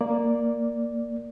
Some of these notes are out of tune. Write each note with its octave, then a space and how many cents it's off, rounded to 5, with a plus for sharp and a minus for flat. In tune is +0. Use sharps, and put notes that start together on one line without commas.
A#3 +0 D5 +0